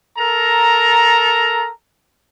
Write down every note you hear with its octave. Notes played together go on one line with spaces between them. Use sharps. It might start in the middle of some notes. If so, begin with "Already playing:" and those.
A4 A#4 A#5